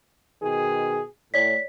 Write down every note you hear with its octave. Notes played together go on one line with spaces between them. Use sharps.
B2 D#3 G#4
A2 C#5 D5 B6